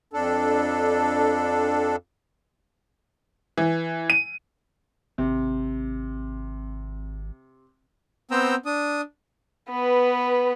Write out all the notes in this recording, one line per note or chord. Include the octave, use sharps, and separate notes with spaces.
F2 D4 A4
E3
D#7
G#1 C3
B3 C4 C5 G5 A#5 E6
D4 D#6
B3 B4